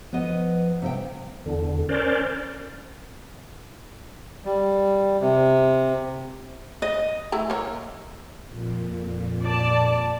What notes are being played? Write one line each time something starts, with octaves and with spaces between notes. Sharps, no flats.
F3 B3 D#5
C3 B3 E5 G5
E2 D3
C#4 A#4 C5 D5
G3
C3
D#5
A3 E4 A#5
A#3 C#5
F2 A#2
D5 A5